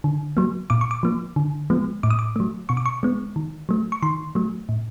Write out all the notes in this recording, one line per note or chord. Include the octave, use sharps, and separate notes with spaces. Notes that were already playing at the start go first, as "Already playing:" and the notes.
D3
F#3 A#3
A#2 D6
C#6
D6
F3 A#3
D3
F3 G#3 B3
A2 D6
D#6
D6
F#3 A3
B2 C#6
D6
C#6
G#3 B3
D#3
F#3 A3
C#6
D#3 C6
F#3 A3
A2